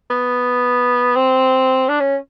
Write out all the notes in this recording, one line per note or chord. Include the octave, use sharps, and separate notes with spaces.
B3
C4
D4
C#4